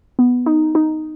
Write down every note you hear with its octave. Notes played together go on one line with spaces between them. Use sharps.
B3
D#4
D#4